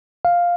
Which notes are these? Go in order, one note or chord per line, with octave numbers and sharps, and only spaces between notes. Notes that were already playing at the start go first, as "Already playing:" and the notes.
F5